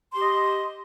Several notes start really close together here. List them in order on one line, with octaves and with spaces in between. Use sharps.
C6 G4 D#5